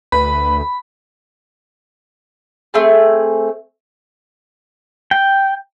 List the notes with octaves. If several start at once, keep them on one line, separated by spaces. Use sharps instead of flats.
D2 B4 B5
A3 C4 G#4
G5